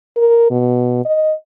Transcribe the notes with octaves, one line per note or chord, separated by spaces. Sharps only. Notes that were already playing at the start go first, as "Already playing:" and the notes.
A#4
B2
D#5